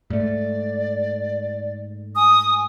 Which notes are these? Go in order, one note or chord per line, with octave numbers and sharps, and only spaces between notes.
G#2 A3 D5
G#5 D#6